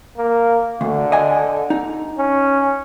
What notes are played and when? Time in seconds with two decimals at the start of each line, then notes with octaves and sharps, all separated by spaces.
0.17 A#3
0.81 D2 D3
1.12 D#5 G#5
1.70 D#4
2.18 C#4